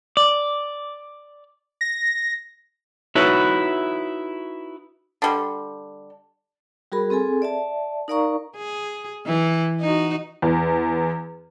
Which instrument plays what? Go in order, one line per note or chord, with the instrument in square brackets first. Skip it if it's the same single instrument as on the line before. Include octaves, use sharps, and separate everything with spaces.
[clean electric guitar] D5
[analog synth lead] A#6
[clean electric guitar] D#4 E4 F#4 B4 C#5 E5
[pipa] D3 G3
[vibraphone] G3 F#4 G#4 A#4 B5
C4 G#4 A4 G#5
D5 E5 A5
D#4 A#4 D5 F5 A#5 C#6
[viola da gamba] G#4
E3
D#4 F#4
[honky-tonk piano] E2